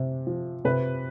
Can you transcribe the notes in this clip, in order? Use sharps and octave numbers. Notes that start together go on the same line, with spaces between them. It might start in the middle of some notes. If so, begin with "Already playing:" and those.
Already playing: C3
F3
C3 B4